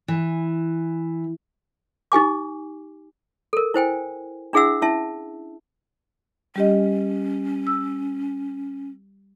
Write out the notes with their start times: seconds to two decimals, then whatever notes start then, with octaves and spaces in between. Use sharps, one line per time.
0.08 E3
2.12 D#4 G4 G#5 D6
3.53 A4 A#4
3.74 E4 C5 G5 G#5
4.53 D4 E4 G#4 E5 F#5 E6
4.82 C#4 E4 E5 A5
6.56 G3 C#4 G4 D#5
7.67 E6